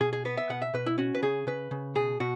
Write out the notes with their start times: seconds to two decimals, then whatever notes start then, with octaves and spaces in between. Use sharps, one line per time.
0.01 B2 G#4
0.13 G#4
0.25 B3 B4
0.37 E5
0.49 B2 F#5
0.62 E5
0.74 B2 B4
0.86 E4
0.98 C#4 F#4
1.15 B4
1.22 C#3 G#4
1.47 C#3 B4
1.71 C#3
1.95 B2 G#4
2.20 B2 F#4